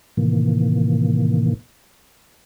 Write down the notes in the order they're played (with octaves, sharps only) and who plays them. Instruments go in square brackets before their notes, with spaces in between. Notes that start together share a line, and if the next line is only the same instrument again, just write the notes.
[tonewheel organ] A2 C3 D#3 E3 A#3